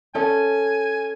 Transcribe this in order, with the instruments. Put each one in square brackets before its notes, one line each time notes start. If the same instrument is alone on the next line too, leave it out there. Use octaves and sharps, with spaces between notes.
[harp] C#4 A4 D#5 [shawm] G#5